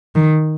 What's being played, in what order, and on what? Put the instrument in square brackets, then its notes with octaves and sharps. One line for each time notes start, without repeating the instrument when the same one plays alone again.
[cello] D#3